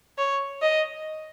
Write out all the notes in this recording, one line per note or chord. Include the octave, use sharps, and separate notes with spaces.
C#5
D#5